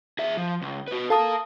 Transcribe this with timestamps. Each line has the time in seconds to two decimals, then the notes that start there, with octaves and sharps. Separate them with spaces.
0.19 G#4 E5
0.37 F3
0.62 C#2
0.88 F#4 B4
1.10 A4 A#4 F5 A5 D#6